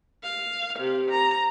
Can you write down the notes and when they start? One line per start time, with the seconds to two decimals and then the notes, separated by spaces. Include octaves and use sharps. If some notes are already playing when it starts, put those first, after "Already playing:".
0.23 F5
0.79 C3
1.10 A#5